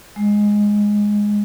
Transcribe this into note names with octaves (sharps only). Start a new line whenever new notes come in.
G#3